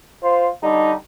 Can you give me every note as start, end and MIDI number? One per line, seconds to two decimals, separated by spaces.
0.22 0.47 65
0.22 0.47 72
0.62 0.92 50
0.62 0.92 55
0.62 0.92 63